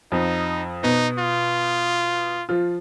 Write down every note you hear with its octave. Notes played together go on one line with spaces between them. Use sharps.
F2 F3 D#4
B2 B3 D#4
F4
F3 F4